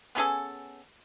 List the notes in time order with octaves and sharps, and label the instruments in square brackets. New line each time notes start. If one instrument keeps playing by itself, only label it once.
[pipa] B3 C#4 G#4 A4